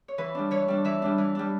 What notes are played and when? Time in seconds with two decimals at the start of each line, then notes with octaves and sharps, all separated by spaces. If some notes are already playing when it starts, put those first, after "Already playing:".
0.08 C#5
0.18 E3 B4
0.35 G3 D4
0.51 E3 C#5
0.68 G3 D4
0.85 E3 E5
1.02 G3 D4
1.18 E3
1.35 G3 D4